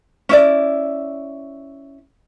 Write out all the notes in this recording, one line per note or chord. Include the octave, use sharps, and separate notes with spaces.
C#4 E4 D5